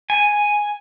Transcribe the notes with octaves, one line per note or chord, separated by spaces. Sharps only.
G#5